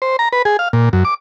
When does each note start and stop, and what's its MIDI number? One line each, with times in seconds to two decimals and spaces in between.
0.02 0.16 72
0.19 0.29 82
0.33 0.42 71
0.45 0.57 68
0.59 0.69 77
0.73 0.89 46
0.93 1.04 42
1.05 1.14 86